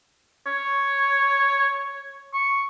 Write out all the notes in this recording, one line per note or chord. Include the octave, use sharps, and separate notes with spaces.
C#5
C#6